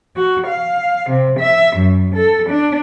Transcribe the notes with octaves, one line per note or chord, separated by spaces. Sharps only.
F#4
F5
C3
E5
F#2
A4
D4